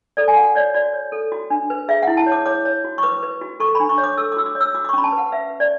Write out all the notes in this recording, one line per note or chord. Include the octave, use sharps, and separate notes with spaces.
A4 D5
G#5
F#4 F#5
C#5 D5
F#4 D5
C#5
A4
F#4
D4
B4
G#4 E5
F#5
E4
A5
C#5
D6
C#5 D6
C#5
F#4
C#6
B4 D6
B4
F#4
A4 C#6
B5
D4
C#6
C#5
D6
A4 E6
D6
F#4 E6
D6
C#5
E6
F#4 D6
D6
C#6
C#4 B5
A5
B4
F#5
B4 E5
B4
D5